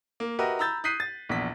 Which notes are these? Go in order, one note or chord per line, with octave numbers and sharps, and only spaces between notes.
A#3
F#4 G4 A#4 B4 D#5 E5
A#5 B5 E6 G6 A6
D#6 F#6 G6 B6 C7 D#7
A6
A#1 E2 B6